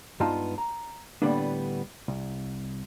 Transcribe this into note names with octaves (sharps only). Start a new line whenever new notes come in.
G2 G#3 B3 D#4 F4 A5
A#5
A2 D3 G3 A#3 B3 D4
C2